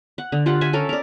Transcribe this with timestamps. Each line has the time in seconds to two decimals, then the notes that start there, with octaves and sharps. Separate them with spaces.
0.18 F#5
0.32 D3
0.46 F4 G4 F#5
0.61 E5 G#5
0.73 C#4 A4 A#4
0.89 A#4 D5